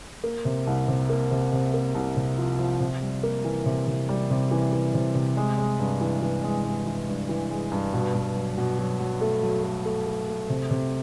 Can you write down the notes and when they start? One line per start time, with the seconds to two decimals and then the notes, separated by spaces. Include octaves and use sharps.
0.24 A#3
0.45 C3
0.67 C2
0.88 C3
1.09 A#3
1.31 C3
1.53 C3
1.74 A#3
1.95 C2
2.17 C3
2.38 F3
2.59 F3
2.80 C3
3.02 G3
3.23 A#3
3.44 E3
3.66 C3
3.87 C3
4.09 G3
4.30 C3
4.51 E3
4.73 E3
4.94 C3
5.15 C3
5.37 G#3
5.58 G#3
5.79 G2
6.01 E3
6.22 E3
6.43 G#3
6.65 G2
6.86 E3
7.08 G2
7.29 E3
7.50 G#3
7.72 G2
7.93 B2
8.15 B2
8.36 F#3
8.58 B2
8.78 F#3
9.00 F#3
9.21 A3
9.43 F#3
9.64 A3
9.85 A3
10.06 A3
10.28 A3
10.50 C3
10.71 C3